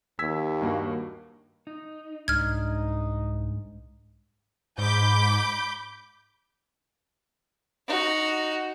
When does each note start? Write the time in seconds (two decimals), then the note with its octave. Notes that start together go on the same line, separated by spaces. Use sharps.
0.19 D#2 E6 G#6 B6
0.61 G2 A#3 F#4
1.67 D#4
2.28 C2 G#2 D4 D#4 F6 G#6
4.78 G#2 B5 D6 G6
7.87 D#4 F#4